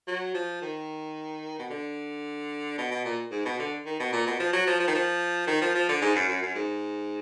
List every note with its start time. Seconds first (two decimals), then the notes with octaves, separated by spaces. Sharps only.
0.07 F#3
0.34 F3
0.62 D#3
1.59 B2
1.70 D3
2.78 B2
2.91 B2
3.05 A#2
3.31 G#2
3.45 B2
3.59 D3
3.86 D#3
3.99 B2
4.12 A#2
4.26 B2
4.40 F3
4.53 F#3
4.67 F3
4.80 F3
4.87 D#3
4.94 F3
5.47 D#3
5.61 F3
5.75 F3
5.89 D3
6.01 G#2
6.15 F#2
6.29 F#2
6.43 F#2
6.55 G#2